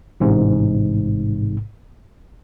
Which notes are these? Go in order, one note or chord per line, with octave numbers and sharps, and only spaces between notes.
A1 G#2 C3